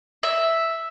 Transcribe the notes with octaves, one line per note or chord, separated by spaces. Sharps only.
E5